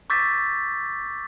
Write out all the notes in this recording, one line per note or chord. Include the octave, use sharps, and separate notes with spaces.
C#6 D6 E6 G6 A6 B6